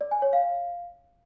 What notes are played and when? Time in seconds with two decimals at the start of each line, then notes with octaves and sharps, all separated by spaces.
0.01 D5
0.11 G#5
0.22 C#5
0.33 F5